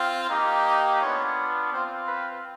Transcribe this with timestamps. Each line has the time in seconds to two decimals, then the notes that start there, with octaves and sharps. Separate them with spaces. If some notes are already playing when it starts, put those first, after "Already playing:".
Already playing: C4 F4
0.30 A#3 D#4 G4
1.02 B3 D4 F4 C#5
1.72 C4 F4 C5
2.08 B4